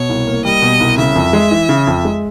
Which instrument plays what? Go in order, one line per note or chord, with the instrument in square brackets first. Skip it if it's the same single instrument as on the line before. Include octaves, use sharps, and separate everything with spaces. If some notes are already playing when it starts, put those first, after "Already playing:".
Already playing: [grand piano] B2 [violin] C#5
[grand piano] C2
A#3
[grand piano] G3 [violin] D#5
[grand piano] B2
C2
[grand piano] C#3 [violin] E5
[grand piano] F2
G#3
E3
C#3
F2
G#3